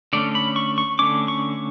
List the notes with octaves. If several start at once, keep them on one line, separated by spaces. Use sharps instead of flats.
D3 A3 C#4 D5
B5
C#6
C#6
D3 A3 C#4 D6
C#6